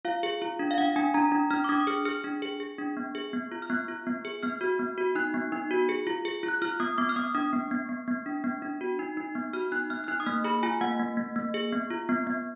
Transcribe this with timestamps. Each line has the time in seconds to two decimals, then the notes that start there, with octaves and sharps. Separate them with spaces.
0.05 F4 F5
0.23 G#4
0.42 F4
0.59 D4
0.71 F5
0.78 D4 F#5
0.96 D4 G#5
1.14 D4 A#5
1.32 D4
1.51 D4 F6
1.64 D6
1.69 D4 D#6
1.80 D#6
1.87 G#4 F6
2.05 G#4 F6
2.24 D4
2.42 G#4
2.60 G#4
2.78 D4
2.97 B3
3.15 G#4
3.33 B3
3.51 F4
3.62 F6
3.70 B3 F#6
3.88 F4
4.07 B3
4.25 G#4
4.43 B3 F6
4.61 F#4
4.79 B3
4.98 F#4
5.15 D#4 F#6
5.34 B3
5.52 D#4
5.71 F#4
5.89 G#4
6.07 F4
6.25 G#4
6.43 F4
6.48 F#6
6.62 F4 F6
6.80 B3 D#6
6.98 B3 D6
7.09 F6
7.16 B3 D#6
7.35 D4 D#6
7.53 B3
7.71 B3
7.89 B3
8.08 B3
8.26 D4
8.44 B3
8.62 D4
8.81 F#4
8.99 D#4
9.17 D#4
9.35 B3
9.53 F#4 F6
9.72 D#4 F#6
9.90 B3 F6
10.04 F6
10.08 D#4 F#6
10.20 D#6
10.26 A#3 F6
10.44 G#4 B5
10.63 F4 G#5
10.81 A#3 F#5
10.99 A#3
11.17 A#3
11.36 A#3
11.54 G#4
11.72 B3
11.90 F4
12.09 B3
12.27 B3